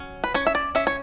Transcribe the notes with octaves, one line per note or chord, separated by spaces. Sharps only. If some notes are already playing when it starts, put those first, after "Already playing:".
Already playing: F#3 C#4
B4
C#4 C#5
E5
D5
C#4 E5
C#5